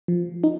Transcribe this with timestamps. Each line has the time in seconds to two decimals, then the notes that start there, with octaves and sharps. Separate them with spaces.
0.08 F3
0.44 D#4